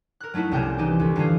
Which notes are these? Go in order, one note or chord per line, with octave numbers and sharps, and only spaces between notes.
A#4 F#6
F#3 A3 D#4 E4 F#4
C2 C3 C#4 G#4 A#4 G5
E3 D#4 G4
D2
D3 E3 G3 F4 G#4